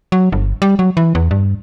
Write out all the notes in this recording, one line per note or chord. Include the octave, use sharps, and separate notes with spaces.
F#3
G1
G3
F#3
E3
E2
G2